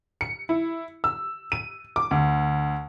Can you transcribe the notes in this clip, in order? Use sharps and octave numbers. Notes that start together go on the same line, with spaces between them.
C#7
E4
E6
D#7
D6
D2